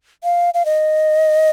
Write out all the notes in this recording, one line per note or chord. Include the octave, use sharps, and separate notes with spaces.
F5
F5
D#5